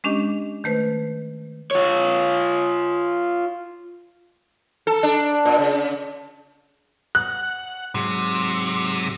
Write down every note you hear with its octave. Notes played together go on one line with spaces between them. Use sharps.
G#3 C#4 D4 G4 D#5
D#3 A3 B4 C5
F4 C#5
A4
D4
A#2
C#3
F#5 F#6
G#2 C3 F#3